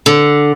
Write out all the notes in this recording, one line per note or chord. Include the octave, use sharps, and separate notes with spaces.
D3